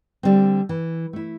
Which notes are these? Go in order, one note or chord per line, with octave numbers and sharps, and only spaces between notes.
D3 G3 C4
E3
A3 E4